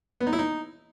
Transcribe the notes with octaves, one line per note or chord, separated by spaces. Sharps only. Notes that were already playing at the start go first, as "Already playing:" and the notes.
B3
D#4
E4
D#4